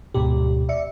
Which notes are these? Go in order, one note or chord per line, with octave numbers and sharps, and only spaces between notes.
D2 G#2 B2 G4
D5 E5 C#7